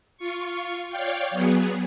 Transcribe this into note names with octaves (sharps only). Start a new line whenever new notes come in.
F4 C#6
C#5 D5 F5 G5
F#3 B3 G#4